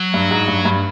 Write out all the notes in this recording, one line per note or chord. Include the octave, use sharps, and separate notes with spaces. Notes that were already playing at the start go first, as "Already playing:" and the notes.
Already playing: F#3
G2
G#2
G2
G2